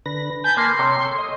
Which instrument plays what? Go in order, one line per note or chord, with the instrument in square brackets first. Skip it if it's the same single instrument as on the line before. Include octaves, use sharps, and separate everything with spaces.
[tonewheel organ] D3 B4 A#6
[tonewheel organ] G#5 A5 B5 [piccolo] G6
[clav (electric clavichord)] A#3 [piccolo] C6
[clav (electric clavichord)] C3 [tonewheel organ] C#5
[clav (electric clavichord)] A4
[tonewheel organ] D#5